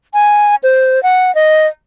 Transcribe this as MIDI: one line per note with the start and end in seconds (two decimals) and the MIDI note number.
0.14 0.55 80
0.63 1.02 72
1.03 1.33 78
1.35 1.67 75